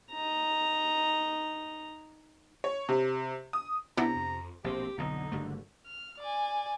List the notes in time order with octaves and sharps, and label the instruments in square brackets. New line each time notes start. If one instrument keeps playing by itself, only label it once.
[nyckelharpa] D#4 A#5
[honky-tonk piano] C#5
C3
D#6
[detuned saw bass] C2 [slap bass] C3 [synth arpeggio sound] B3 D4 E4 [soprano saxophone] A#5
[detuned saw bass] F2
[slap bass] A#1 B2 [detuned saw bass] C4 [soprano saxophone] G4
[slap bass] B1 F2 [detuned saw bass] D3 [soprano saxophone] D#4
[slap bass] F#1 G2 A3
[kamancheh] F6
D5 G#5